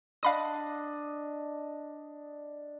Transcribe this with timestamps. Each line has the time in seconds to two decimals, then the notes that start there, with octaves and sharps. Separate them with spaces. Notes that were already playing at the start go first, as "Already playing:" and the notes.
0.23 D4 D#5 F5 B5 D#6